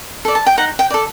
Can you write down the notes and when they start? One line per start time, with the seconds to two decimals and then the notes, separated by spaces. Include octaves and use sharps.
0.25 A4 D5
0.35 A5
0.46 G5
0.58 D#4 F#5
0.79 G5
0.90 A4 D5